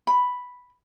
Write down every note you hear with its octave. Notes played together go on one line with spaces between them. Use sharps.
B5